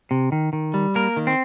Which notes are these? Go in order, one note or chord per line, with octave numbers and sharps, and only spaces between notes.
C3
D#3
D#3
G3
A#3 A#4
D#3
C4